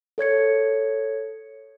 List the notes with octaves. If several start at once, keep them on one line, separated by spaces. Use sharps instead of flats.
A4 C#5 G#6 C#7